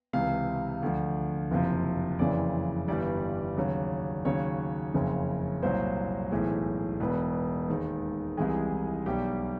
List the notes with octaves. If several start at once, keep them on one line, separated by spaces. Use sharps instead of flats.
C#2 C3 E3 F5
D2 D3 F3
F#1 F2 C3 F3
F#1 F2 C#3 E3 D5
G1 G2 E3 G3 D5
D#2 C#3 F#3
D#2 C#3 F#3 C#5
F#1 F2 C#3
C2 A#2 F#3 C5
B1 A2 E3 G#3
E1 E2 B2 B4
D#2 D#3 G#3
C2 C3 E3 G#3 G#4
B1 B2 G3 G4